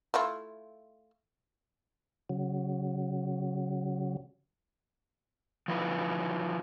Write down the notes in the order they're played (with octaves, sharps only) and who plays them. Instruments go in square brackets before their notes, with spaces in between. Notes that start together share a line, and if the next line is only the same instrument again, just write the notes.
[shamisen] A3 E4 F4
[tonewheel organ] C#3 F#3
[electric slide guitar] F3 F#3 D#4 E4 B4